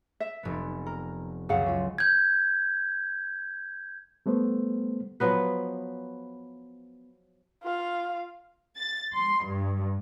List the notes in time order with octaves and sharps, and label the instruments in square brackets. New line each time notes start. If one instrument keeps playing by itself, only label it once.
[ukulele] E5
[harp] F1 B3
[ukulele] A#4
[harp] C#2 F#2 [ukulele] G#4 F5 F#5
[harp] C#4 F4
[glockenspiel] G6 G#6
[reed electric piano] G3 A3 B3 C5
[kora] F3 F#3 B3 B4
[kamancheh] F4 F5
[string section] A6
C6
G2